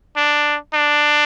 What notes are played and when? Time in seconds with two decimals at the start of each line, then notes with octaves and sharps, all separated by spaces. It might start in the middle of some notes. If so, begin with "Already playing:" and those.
0.16 D4
0.74 D4